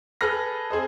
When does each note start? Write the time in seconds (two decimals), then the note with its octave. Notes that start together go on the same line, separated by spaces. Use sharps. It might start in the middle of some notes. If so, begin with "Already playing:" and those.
0.21 G#4 A4 B4 B5 F6 A#6
0.70 C4 G#4 C5 D#5